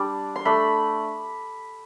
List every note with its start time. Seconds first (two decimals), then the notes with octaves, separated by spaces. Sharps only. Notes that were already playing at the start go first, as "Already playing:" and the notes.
Already playing: G3 D4
0.36 C6
0.45 A3 D4 B5